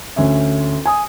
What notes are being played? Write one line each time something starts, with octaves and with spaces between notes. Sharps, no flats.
D2 C#4 E5
G#5 D#6